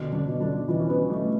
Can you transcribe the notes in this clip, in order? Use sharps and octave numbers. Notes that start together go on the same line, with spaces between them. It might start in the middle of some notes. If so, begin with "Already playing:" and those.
Already playing: B2 D3 D4
D3 D4
B2
D3 D4
B2 E3 E4
C#4
B2 B3
B2 A3